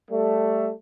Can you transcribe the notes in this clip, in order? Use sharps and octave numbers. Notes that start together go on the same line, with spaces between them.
G3 A3